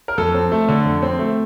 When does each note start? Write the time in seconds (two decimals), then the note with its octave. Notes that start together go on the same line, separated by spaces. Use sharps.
0.08 A#4
0.18 F2 A4
0.34 C4
0.52 A3
0.69 D3
0.86 F2
1.02 C4
1.19 A3